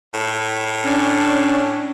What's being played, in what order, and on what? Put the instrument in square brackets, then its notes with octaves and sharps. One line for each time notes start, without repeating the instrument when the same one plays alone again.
[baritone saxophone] A2
[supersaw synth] C#4 D4